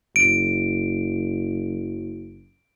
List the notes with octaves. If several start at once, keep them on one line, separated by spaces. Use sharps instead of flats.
F#1 D7